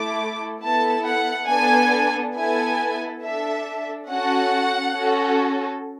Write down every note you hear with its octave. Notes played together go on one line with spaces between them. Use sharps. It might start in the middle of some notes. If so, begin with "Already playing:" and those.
Already playing: A3 E4 A4 D6
B3 E4 A4 A5
F#5
B3 D4 A4 G#5
B3 E4 A4 G#5
D4 A4 E5
C#4 F#4 A4 F#5
C#4 F#4 A4